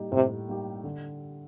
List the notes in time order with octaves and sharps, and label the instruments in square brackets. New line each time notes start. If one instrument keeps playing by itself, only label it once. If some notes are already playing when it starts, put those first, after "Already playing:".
Already playing: [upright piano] A2 G3 A#3 D#4 G4
[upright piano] A2 [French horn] C3
[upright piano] G3 A#3 D#4 G4
D3